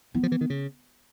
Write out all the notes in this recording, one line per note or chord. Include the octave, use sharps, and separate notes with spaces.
E3 B3
F3
E3
D#3
C#3